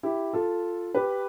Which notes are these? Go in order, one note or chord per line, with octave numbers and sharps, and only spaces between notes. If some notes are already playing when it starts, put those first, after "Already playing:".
E4 G4
F4 A4
G4 B4